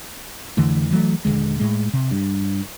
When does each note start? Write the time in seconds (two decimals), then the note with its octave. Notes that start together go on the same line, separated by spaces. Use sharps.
0.57 F2 D3 E3 A3
0.90 E3 F#3 A3
1.25 D#1 D#2 D3 G#3
1.60 A2 G#3
1.93 C3
2.11 G2